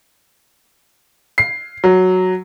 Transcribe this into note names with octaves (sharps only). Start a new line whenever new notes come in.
C7
F#3